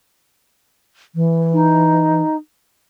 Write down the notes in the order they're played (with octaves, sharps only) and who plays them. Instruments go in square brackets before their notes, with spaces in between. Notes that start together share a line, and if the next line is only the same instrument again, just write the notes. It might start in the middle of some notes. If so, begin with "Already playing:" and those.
[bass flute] E3
[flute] D#4